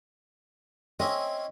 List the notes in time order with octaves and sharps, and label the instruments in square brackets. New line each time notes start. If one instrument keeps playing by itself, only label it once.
[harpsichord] C4 C#4 E4 [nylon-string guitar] D#5